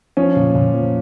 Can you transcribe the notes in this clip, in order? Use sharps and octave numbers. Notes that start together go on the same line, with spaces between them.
F3 C#4
A#2
A#2
F3